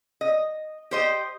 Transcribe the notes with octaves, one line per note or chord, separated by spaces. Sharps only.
D#5
G4 C5 D#5